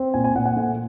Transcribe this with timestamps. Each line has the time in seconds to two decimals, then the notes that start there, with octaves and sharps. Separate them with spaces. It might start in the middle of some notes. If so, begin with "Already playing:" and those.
Already playing: C4
0.14 A#2 G#5
0.24 G#5
0.35 A#2 F#5
0.46 F#5
0.56 A3